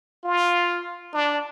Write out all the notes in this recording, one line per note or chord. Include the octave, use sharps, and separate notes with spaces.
F4
D4